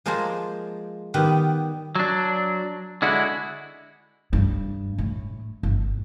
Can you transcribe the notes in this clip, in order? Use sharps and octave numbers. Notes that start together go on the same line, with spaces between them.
F3 G#3 A#3 A#4 C5 A5
D#3 G3 B3 G4 F#5
F#3 D4
D3 G#3 E4 F#4
G2
A2
G1